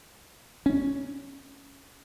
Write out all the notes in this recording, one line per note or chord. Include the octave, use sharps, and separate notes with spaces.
C#4